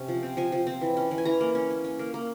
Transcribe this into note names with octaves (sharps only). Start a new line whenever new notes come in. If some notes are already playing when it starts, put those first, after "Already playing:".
Already playing: C3 C#4
F3
C4
F3 G#5
F3
C4
E3
C#4
E3
G#5
E3 A#5
A#3
C#4
C#4
C#4
A#3
A#3